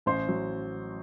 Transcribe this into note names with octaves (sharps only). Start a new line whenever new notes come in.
A1 C5
F#3